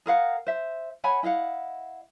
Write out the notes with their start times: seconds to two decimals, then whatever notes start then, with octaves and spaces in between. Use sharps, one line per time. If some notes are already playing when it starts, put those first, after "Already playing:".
0.06 G#4 A#4 F5 F#5
0.47 C5 E5
1.04 C#5 F#5 G#5 B5
1.23 E4 D#5 F5 F#5